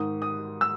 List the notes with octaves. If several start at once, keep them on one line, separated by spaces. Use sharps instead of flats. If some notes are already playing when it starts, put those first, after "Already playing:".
Already playing: G#2 D#3 D#6
D#6
E6